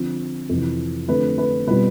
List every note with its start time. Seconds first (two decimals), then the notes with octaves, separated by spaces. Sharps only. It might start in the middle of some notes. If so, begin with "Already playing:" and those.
Already playing: D3 F3 C4
0.49 F2 C3 E3
1.08 D3 F3 A3 C4 B4
1.38 B4
1.67 B2 G3 C4 F4 B4